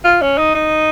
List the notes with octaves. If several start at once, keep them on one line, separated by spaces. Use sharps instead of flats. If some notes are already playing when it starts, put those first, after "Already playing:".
F4
C#4
D#4
D#4